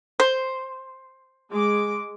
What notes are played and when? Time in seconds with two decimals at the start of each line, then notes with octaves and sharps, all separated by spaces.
0.20 C5
1.51 G#3 D6